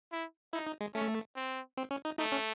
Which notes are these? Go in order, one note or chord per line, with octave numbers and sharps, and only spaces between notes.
E4
D#4 E4
D#4
G#3
A3 C#4
C4
C4
C#4
D#4
A3 D#4
C#4